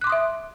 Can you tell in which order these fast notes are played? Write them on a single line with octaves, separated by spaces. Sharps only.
F#6 D6 C6 D#6 E5